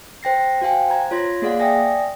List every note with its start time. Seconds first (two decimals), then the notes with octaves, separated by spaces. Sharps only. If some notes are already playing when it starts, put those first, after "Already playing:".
0.23 C5 G5 A#6 C7
0.62 F#4 C5 F5 G5 G#5
0.90 C5 A#5 G#6
1.11 F4 C#5 C6 G#6 A#6
1.42 A#3 G#4 D5 F5 F#5
1.60 D5 E5 G5 G#5 D#6 A#6